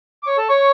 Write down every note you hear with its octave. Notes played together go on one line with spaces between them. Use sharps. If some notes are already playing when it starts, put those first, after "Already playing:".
D6
C#5 C#6
A4 A5
C#5 C#6